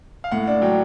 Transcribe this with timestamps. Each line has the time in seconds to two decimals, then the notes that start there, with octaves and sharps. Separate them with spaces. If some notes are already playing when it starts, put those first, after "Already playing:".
0.24 F5
0.31 A2 F#5
0.47 D4
0.62 F#3 G5